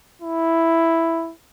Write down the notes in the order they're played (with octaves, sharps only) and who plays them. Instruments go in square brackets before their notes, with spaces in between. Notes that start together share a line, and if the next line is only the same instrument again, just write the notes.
[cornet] E4